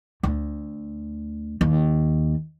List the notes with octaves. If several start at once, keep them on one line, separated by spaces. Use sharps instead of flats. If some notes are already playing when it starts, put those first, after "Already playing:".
D2
D#2